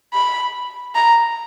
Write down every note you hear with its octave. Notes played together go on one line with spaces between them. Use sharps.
B5
A#5